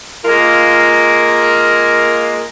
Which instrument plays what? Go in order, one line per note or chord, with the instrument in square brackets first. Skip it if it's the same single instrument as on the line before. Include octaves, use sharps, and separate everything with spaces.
[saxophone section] G#3 A#3 F4 A#4